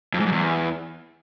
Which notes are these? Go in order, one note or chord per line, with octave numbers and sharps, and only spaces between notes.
F2
G#2
F#2
E2